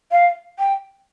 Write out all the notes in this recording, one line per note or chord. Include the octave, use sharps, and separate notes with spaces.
F5
G5